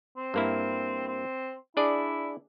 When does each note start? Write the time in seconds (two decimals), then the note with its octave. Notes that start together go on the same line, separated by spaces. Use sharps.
0.17 C4
0.34 G2 A#3 E4
1.07 C4
1.77 D4 E4 G#4 D5